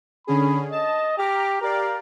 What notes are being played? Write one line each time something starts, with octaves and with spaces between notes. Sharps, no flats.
D3 C#4 G#4 B5
D#5 A5
G4 A#5 D6 F6
G4 A#4 D5 F5